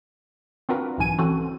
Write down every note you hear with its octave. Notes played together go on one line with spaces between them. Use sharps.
C4 D4 F4 F#4 A#4 B4
B1 G#2 D#3 E3 G#5 D#7
E3 C4 C#4 F#4 A4